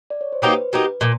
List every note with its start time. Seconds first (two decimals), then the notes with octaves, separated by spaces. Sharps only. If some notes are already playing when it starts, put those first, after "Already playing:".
0.10 D5
0.21 C#5
0.32 C5
0.42 F#3 A#3 D#4 G4 B4
0.73 F#3 A#3 D#4 G4
1.01 A#2 F3